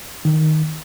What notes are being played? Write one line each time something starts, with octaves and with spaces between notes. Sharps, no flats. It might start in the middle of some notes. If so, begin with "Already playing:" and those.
D#3